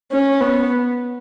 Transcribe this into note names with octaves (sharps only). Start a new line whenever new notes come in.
C#4
B3